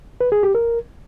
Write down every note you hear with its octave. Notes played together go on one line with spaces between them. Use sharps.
B4
G#4
G4
A#4